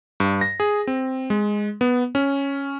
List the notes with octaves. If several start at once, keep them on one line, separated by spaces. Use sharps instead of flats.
G2
A#6
G#4
C4
G#3
B3
C#4